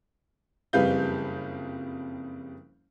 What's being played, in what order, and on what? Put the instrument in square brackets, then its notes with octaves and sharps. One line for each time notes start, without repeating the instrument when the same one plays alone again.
[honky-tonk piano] F#1 F2 G3 B4 F5 G6